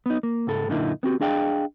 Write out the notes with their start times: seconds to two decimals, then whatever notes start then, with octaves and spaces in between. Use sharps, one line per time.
0.06 B3 D#4
0.23 A#3
0.47 C#2 G#2 A4
0.69 F#2 A#2 D3 A#3 D#4 E4
1.03 B3 C4 F#4 G4
1.21 D4 G#4 D#5 F5 G5